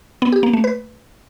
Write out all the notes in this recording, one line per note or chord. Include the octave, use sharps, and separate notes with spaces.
B3
G4
A#3
A3
B4